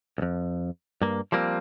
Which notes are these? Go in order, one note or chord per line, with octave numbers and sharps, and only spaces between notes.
C2 F2
G2 A#3
F3 G3 A#3 C4